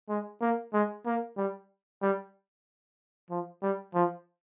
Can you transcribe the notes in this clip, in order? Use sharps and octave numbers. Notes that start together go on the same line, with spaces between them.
G#3
A#3
G#3
A#3
G3
G3
F3
G3
F3